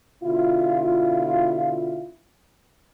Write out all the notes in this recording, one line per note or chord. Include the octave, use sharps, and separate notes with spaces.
B2 D3 E4 F4